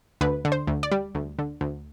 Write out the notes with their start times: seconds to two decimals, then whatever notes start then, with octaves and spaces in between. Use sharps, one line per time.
0.21 D2 B4
0.45 D3
0.52 C5
0.67 D2
0.83 D5
0.92 G3
1.15 D2
1.39 D3
1.61 D2